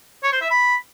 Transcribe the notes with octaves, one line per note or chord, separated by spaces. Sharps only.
C#5
C5
E5
B5